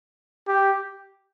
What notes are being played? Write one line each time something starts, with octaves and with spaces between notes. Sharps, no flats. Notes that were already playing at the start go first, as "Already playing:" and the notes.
G4